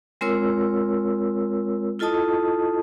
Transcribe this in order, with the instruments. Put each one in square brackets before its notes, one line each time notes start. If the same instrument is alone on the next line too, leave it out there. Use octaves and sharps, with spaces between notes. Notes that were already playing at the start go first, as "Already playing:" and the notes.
[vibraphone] G#3 C4 F4 A#4 C#5 E6
E4 F4 A4 D#5 A5 D#6